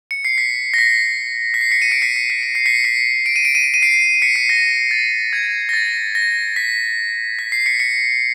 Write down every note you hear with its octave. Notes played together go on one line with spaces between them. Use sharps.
C#7
C7
B6
A#6
B6
B6
C7
B6 C#7
C#7 D#7
C7 D7
B6 C#7
C7
B6 C#7
C#7
C7
B6 C#7
B6 C#7
D7
D#7
D7
D#7
D7
D#7
C7 D7
B6 C#7
C7
A#6
A6
G#6
A#6
A6
A#6
B6
B6
C7
B6 C#7
B6 C#7